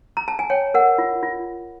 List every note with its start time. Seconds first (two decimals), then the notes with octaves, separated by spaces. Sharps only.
0.17 A#5
0.28 A5
0.39 G#5
0.50 C#5 G5
0.74 A#4 F#5
0.98 F4
1.23 F4